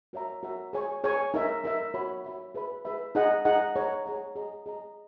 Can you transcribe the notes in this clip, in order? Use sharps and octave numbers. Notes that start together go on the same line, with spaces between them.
F#4 A#4 C#5 E5 A#5
F#4 A#4 C#5 E5 A#5
G#4 C#5 G#5 C#6
G#4 C#5 G#5 C#6
D#4 A#4 E5
D#4 A#4 E5
F#4 C#5 E5 B5
F#4 C#5 E5 B5
G#4 B4 E5 B5
G#4 B4 E5 B5
D#4 G#4 D#5 F#5
D#4 G#4 D#5 F#5
G#4 C#5 F#5 A#5
G#4 C#5 F#5 A#5
G#4 D#5 A#5
G#4 D#5 A#5